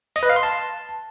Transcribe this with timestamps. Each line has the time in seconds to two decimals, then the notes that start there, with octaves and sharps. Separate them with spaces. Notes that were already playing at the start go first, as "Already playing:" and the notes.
0.16 D#5
0.23 B4
0.29 F5
0.36 C6
0.43 A5